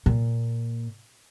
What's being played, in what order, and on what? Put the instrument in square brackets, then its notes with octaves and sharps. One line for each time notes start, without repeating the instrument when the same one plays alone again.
[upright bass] A#2